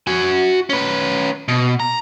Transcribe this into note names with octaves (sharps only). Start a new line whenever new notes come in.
F#4 G#5
C#4 B4
B2
A#5